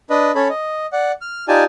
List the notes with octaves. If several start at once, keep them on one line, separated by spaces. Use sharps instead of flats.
D4 B4 D#5
C#4 A4 C#5 B5
D#5
D5 F#5
F6
D#4 F4 G4 D5 G#5 A5